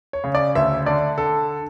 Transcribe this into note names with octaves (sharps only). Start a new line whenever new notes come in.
C#5
C#3
D5
D2 E5
D3 D5
D3 A4